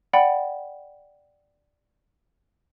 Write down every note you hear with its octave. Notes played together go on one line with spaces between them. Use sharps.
D5 F#5 G5 B5